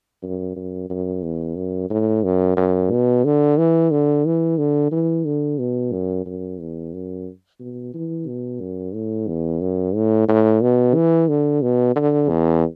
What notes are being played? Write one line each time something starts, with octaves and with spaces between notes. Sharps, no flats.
F#2
F#2
F#2
E2
F#2
A2
F#2
F#2
B2
D3
E3
D3
E3
D3
E3
D3
B2
F#2
F#2
E2
F#2
B2
E3
B2
F#2
A2
E2
F#2
A2
A2
B2
E3
D3
B2
D3
E2